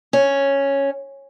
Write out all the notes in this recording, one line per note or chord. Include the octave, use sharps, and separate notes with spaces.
C#4